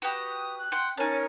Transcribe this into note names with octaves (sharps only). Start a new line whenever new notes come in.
F#4 G4 B4 D#6
F#6
F#5 G5 C6
C#4 D#4 A#4 G#5 A5